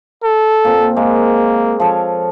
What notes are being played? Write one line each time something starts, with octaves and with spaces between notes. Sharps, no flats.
A4
A#2 C4
G#3 A#3
F3 A4 C#5